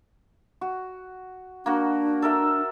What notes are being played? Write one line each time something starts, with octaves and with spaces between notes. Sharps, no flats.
F#4
A#3 D4 F#4
A4 A#4 E5